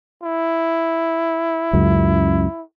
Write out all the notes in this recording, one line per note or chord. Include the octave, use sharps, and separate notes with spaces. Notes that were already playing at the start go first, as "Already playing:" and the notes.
E4
C#2 F#2